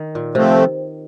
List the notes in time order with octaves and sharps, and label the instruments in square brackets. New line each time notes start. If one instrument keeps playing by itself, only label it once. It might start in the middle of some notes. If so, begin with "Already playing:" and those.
Already playing: [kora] D#3
A#2
[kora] C3 [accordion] F3 A3 C4